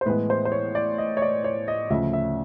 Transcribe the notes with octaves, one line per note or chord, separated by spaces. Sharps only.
C5
A2 E3 G#3 B3 B4
C5
C5
C#5
D5
D#5
C#5
D5
C#5
D#5
D2 C#3 F3 E5
E5